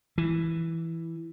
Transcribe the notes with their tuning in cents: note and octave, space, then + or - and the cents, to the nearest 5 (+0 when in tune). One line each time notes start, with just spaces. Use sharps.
E3 +0